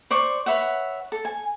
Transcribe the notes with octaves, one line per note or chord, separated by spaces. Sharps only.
C5 D5 C#6
B4 C#5 E5 F#5
A4
G#5